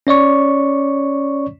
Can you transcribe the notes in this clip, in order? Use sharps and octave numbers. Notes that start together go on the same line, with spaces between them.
C#4 C#5 D5 C#6